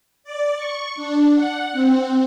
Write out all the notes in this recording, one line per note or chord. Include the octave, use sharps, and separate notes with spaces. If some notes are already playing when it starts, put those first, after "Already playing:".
D5
C#6
D4
F#5
C4